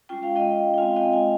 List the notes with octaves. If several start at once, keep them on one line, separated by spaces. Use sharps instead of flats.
G#3 C#4 F4 G5
F5
D#5 G5
G5
G#3 C4 F4 F5 G#5
D#5 G5
F5 G#5